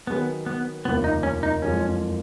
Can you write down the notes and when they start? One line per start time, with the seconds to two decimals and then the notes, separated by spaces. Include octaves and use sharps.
0.07 D#3 F#3 B3 C#4 G#4 B4
0.46 B3
0.85 F1 D#2 C#3 F3 B3
1.04 D#4
1.23 C#4
1.43 D#4
1.62 F#1 F2 F3 G#3 C#4